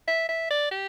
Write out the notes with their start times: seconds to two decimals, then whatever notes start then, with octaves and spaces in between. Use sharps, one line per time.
0.08 E5
0.29 E5
0.51 D5
0.71 G4